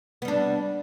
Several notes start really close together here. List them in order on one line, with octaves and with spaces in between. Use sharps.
B3 G3 D4